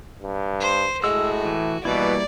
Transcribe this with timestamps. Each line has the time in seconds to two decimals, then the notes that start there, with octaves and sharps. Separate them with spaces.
0.22 G2
0.60 C5
1.04 A2 G#3 F#4 E6
1.45 E3
1.85 B2 E3 G3 A#3 E4 D5